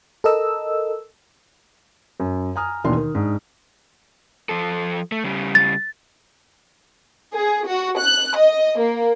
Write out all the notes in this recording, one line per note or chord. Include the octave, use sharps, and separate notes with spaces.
A4 A#4 D#5 E6
F#2
G#5 A#5 D#6 F6
D#2 B2 D#3 E3 D4 C6
D#3
G#2 D4
F3 A4
A3
C#3 G3
A6
G#4
F#4
F#6
D#5
A#3